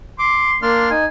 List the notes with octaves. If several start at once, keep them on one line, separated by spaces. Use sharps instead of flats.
C6 D6
A#3 D4 C6 F6
D#4 G#5